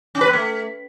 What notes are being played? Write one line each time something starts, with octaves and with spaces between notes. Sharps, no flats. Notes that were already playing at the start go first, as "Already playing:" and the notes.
C#4
B4
B3
A3